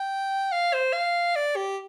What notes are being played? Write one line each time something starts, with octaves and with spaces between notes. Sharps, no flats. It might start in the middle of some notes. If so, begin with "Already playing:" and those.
Already playing: G5
F5
C5
F5
D5
G4